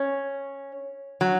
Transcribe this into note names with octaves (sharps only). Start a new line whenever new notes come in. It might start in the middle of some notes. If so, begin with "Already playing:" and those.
Already playing: C#4
F#3